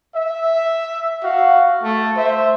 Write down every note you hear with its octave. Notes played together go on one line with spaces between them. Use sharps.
E5
F#4 F5
A3
C5 E5